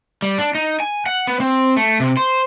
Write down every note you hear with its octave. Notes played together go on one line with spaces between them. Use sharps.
G3
D4
D#4
G#5
F#5
B3
C4
A3
C3
C5